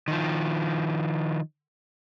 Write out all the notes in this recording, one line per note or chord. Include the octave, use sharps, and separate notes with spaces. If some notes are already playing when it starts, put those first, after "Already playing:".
D#3 F3